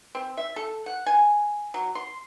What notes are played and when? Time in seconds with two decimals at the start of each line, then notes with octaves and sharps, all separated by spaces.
0.15 C4
0.37 E5
0.56 A4
0.86 F#5
1.06 G#5
1.74 F#3
1.95 C6